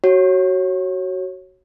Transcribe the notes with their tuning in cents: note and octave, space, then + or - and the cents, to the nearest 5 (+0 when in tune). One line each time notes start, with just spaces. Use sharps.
F#4 +20 C#5 -15